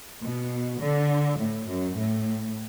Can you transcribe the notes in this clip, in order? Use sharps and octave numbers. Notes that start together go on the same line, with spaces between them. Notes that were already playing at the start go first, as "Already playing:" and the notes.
B2
D3
A2
F#2
A2